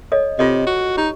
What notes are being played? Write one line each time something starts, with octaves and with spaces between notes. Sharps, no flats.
A4 C#5 D#5
C3 F4 A4 D#5
F#4
D#4 G4